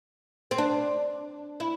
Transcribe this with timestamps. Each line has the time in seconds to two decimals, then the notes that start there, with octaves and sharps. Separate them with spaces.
0.51 C4
0.58 D4
1.60 E4